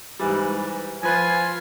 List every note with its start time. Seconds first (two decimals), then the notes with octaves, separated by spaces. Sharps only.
0.19 G#2 E3 G3
1.03 F3 F4 B4 G#5